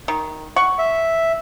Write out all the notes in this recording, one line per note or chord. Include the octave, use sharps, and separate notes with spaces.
D#3
F#5 C#6
E5